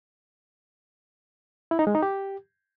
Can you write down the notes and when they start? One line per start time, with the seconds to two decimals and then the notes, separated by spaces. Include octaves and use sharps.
1.71 E4
1.79 D#4
1.87 G#3
1.95 D#4
2.02 G4